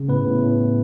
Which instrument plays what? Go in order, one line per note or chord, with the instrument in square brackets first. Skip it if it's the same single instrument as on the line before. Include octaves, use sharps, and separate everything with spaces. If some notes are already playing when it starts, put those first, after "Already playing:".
Already playing: [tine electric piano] C#3
A2 B3 B4
A2
A2